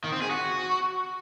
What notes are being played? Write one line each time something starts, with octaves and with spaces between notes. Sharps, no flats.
D#3
C4
G#4
F#4